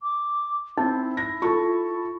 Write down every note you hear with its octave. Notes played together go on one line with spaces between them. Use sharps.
D6
C4 D#4 E4
A#6
F4 A4 C#6